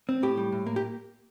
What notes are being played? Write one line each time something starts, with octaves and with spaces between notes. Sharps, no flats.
C4
A2 G4
G3
A2
A#3
G4